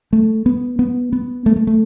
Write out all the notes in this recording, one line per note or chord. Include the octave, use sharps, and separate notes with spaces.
A3
B3
B3
B3
A3
A3
A3